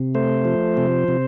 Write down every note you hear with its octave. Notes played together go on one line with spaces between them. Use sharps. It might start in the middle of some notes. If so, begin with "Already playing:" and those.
Already playing: C3
A3 C5
F3
C3
C3